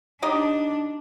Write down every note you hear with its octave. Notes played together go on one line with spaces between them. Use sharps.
D4 D#4 G4 D#5